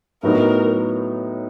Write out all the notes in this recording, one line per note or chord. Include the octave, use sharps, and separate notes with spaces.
A2 F#3 B3 D#4 A#4